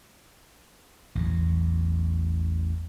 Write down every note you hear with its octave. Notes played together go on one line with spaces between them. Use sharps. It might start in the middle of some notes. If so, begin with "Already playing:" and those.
A1 E2 F#3